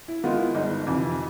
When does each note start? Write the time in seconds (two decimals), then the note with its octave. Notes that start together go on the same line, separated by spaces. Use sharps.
0.08 E4
0.24 D#3 G#3 B3 F4
0.39 E4
0.55 G1 D#4
0.86 F2 C3 E3